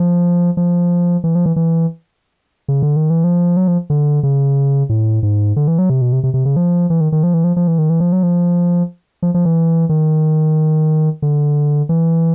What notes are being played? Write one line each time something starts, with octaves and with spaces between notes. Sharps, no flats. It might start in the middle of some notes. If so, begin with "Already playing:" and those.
Already playing: F3
F3
E3
F3
E3
E3
C#3
D3
D#3
E3
F3
F#3
F3
D3
C#3
A2
G#2
D3
E3
F#3
C3
B2
C3
C3
C3
C#3
F3
E3
D#3
D#3
F3
E3
F3
F3
E3
D#3
E3
F3
F#3
F3
F3
F3
E3
D#3
D3
E3